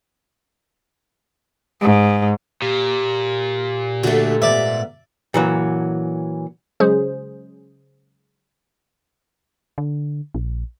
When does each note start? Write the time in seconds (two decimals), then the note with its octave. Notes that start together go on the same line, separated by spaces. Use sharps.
1.81 G#2
2.62 A#2 G4
4.03 D3 A3 F#4
4.42 G#2 B3 D5 E5
5.34 A#2 E3 F#3
6.80 C#3 F#3 G#3 C#4 G#4 C5
9.78 D3
10.34 A#1